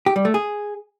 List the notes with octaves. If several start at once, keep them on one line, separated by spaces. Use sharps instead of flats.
G4
G3
A3
G#4